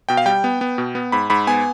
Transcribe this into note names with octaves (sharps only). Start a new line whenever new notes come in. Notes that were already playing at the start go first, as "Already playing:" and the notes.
B2 G5
F5
G3 G5
B3
B3
B2
B3
G#2 B5
G#2 B5
B3 G#5